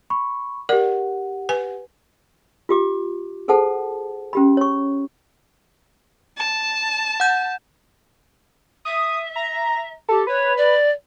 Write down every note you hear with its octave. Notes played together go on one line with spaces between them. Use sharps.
B5 C#6
G4 A#4 D5 F#5
B4 G#5
F4 G4 D6
G#4 A4 C5 F#5 A5
C#4 G4 B5
C#5 C#6
A5
F#5 G6
E5 D#6
A#5
G4 A4
B4 C#5
D5